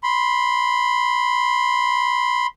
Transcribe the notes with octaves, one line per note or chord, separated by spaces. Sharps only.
B5 C6